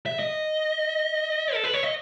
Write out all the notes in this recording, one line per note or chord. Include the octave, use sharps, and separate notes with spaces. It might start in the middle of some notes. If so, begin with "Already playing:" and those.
E5
D#5
A4
B4
C#5
D#5